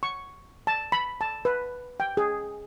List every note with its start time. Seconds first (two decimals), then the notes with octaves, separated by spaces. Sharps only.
0.03 C#6
0.67 A5
0.92 B5
1.21 A5
1.45 B4
2.00 G5
2.17 G#4